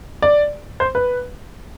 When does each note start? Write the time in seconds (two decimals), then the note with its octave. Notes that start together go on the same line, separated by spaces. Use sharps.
0.22 D5
0.80 C5
0.95 B4